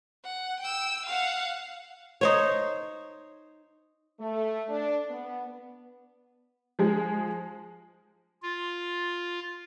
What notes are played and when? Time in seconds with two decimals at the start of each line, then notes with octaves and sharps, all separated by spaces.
0.24 F#5
0.60 G5 E6
1.06 F5 F#5
2.21 D#4 C5 C#5
4.20 A3
4.69 D4
5.09 B3
6.79 F3 G#3 G#4
8.42 F4